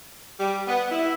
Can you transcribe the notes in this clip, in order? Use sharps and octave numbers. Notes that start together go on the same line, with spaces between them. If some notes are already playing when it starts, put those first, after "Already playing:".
G3
B3
E4